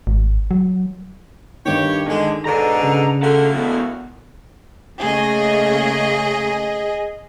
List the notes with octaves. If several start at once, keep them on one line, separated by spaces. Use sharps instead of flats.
G#1
F#3
G2 D3 D#3 G4 C#5
D3 D#3 G#3
G#2 B2 D3 A4 A#5
C#3 G#4
A3 A#3 F#4 A4 F#5
E2 B2
C#3 A3 A#3 G#4 D#5